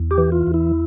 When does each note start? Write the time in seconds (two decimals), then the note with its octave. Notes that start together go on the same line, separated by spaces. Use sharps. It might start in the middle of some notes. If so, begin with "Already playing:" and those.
Already playing: E2
0.11 G4
0.18 E3
0.32 F4
0.47 E2
0.54 E4